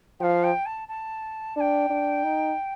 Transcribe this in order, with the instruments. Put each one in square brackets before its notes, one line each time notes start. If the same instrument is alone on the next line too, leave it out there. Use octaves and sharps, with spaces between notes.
[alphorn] F3 [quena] F5 G5
[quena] G5
A5
A5
[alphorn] D4 [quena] A5
[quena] G5
[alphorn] D4
D#4